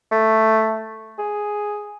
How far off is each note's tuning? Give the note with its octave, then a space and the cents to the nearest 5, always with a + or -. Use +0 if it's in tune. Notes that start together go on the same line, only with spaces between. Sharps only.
A3 +5
G#4 +0